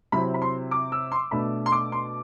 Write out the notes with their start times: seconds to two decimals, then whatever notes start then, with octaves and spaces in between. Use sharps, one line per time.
0.12 C3 F#3 C4 E4 B5
0.34 B5
0.42 C6
0.71 D6
0.92 E6
1.12 C6
1.31 B2 A3 D4 B5
1.66 C6
1.72 D6
1.92 C6